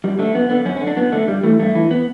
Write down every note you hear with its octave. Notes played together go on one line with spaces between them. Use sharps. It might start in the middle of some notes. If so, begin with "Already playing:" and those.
F#2 G3
D3 A3
F#2 B3
D3 B3
F#2 C#4
C#4
D3
D4
F#2 B3
D3 A3
G2 G3
E3 A3
G2 A3
E3
B3